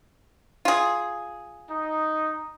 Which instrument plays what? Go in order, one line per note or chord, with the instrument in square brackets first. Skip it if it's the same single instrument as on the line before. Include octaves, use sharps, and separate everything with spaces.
[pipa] F4 G#4
[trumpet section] D#4